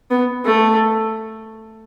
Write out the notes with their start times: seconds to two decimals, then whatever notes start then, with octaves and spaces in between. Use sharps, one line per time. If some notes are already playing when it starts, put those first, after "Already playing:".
0.11 B3
0.45 A3